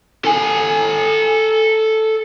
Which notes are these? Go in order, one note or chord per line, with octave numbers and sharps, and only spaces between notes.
A4 G#5